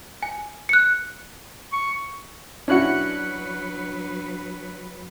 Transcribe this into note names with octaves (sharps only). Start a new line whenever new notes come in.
G#5
F#6 C#7
C#6
F#3 C#4 D4 E4 F#4 B4 F#6 C#7